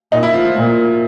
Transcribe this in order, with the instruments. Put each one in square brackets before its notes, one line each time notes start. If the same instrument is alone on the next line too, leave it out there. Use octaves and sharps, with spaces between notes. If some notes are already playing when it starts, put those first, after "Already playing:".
[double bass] A#2 [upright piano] D#4
[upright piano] E4
F3 F4
F3 F4
[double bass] A#2